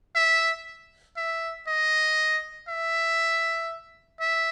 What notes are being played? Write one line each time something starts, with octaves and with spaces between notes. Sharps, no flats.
E5
E5
D#5
E5
E5